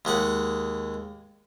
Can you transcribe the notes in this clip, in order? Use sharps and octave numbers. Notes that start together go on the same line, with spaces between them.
D#2 G#3 F#5